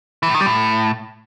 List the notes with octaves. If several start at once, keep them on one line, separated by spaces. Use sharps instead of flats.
E3
A2
D#3
G3
A2